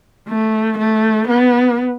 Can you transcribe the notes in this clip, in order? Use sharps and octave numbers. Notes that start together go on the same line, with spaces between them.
A3
A3
B3